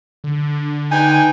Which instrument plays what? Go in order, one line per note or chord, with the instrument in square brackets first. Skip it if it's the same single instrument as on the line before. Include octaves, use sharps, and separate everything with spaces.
[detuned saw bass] D3
[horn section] D#4 B4 G#5 [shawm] G5